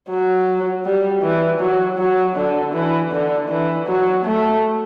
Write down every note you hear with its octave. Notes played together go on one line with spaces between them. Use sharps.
F#3
G3
E3
F#3
F#3
D3
E3
D3
E3
F#3
A3